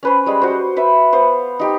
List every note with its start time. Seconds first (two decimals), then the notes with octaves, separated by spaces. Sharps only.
0.03 C#4 B4 C5
0.26 G3 G#3
0.42 F#4 C5
0.77 B4 E5
1.12 B3 C5 F5
1.59 D#4 G4